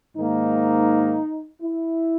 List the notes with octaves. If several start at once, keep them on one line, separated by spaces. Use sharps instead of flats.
G#2 D#3 A#3 D#4
E4